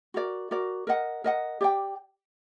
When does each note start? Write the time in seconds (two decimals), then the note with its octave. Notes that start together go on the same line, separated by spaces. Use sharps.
0.14 F#4 A#4 D5
0.51 F#4 A#4 D5
0.87 A#4 D#5 F#5
1.24 A#4 D#5 F#5
1.61 G4 D5 G5